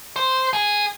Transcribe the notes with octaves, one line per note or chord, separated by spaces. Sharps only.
C5
G#4